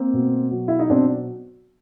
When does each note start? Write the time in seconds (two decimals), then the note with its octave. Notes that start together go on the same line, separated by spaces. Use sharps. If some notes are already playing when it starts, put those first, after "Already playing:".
Already playing: A#3 C4
0.13 B2
0.51 F#3
0.68 E4
0.79 D#4
0.90 B2 C4 D4